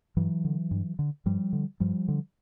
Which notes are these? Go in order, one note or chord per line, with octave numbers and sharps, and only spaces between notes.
G2 E3 F#3
D3
G2
D3
G2 F3 G3
D3
G2 F3 G3
D3